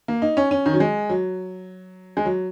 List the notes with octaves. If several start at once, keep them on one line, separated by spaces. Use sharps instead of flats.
A#3
D#4
C#4
C#4
D#3
F#3
G#3
F#3
G#3
F#3